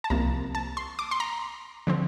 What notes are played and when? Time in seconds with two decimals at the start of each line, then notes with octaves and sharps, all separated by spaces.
0.04 A5
0.10 C2 C3 F3 A#3 A#5
0.55 A5
0.77 C6
0.99 D6
1.11 C6
1.20 A#5
1.87 D3 F3 C4